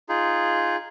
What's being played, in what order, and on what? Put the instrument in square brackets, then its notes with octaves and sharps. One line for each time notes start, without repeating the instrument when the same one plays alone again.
[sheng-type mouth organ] D#4 F4 G#4